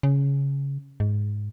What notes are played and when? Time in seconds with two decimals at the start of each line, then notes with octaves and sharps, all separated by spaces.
0.03 C#3
1.00 G#2